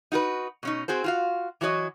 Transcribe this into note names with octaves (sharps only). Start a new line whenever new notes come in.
D#4 F#4 A#4 B4
B2 C#4 D#4
C4 F#4 G#4 C5
F4 F#4 F5
E3 F#3 F#4 C#5 D#5